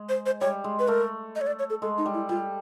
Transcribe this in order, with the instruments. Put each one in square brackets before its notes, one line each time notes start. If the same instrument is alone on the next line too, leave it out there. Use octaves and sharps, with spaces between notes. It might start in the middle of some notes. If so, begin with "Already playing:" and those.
Already playing: [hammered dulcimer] G#3
[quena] C5
C5
[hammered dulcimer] G3 [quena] C#5
[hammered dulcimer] G#3
[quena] B4
[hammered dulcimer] A3 [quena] A#4
[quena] D#5
C#5
D5
C#5
A4
[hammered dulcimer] G#3 [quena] A4
[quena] D#4
[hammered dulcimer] G3
[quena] E4
[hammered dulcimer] G3 [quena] F4